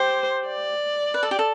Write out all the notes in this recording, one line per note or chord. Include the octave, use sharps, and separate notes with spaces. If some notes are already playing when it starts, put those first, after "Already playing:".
Already playing: G4 C5
D5
B4
A4
G4
A4